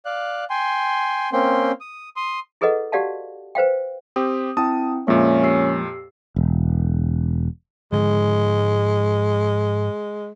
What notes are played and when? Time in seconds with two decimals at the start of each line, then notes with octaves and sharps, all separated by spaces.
0.05 D5 F5 F#6
0.50 G5 G#5 C6
1.33 A#3 C4 C#4 G5 C6
1.81 D#6
2.16 C6 D#6
2.61 E4 G#4 A4 B4 D#5 F#5
2.92 F#4 G4 D5 F5 F#5 A5
3.55 B4 C5 F5 G5
4.16 C4 G4 D#6
4.57 C4 E4 G5 A5 D#6
5.08 F2 A#2 F3 G#3 A#3 C#4 E5
5.43 G4 E6 C7
6.36 E1
7.92 G#2 D3 F3 G#3